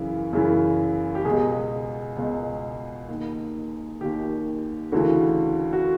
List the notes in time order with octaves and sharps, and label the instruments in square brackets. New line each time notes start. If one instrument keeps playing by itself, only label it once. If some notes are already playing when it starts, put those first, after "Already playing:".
Already playing: [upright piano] F#2 C#3 E3
F#2 C#3 E3
G4
C#2 B2 G#4
C#2 B2
D#2 D#3
D#2 D#3 G4
D2 C#3 E3 F#4
F#4